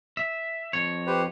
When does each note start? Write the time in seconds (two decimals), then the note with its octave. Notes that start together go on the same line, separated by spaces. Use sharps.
0.17 E5
0.73 F2 C#5
1.07 G4 B4 C5